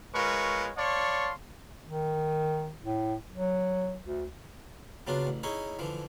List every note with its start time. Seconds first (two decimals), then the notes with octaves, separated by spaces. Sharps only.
0.14 G#3 F4 A#4 B4 C#5 C#6
0.77 C#5 D5 F5 A5 C6 C#6
1.86 D#3
2.83 A2
3.33 F#3
4.05 D2
5.07 C#3 F#3 B3 D4 F4
5.27 A1
5.43 C#4 D#4 E4 G#4 C#5
5.79 D3 E3 F3